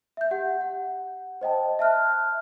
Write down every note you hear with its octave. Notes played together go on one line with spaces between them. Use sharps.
E5 G6
G4 F#5
F#5
C5 D#5 G5 A5
E5 A5 F6 F#6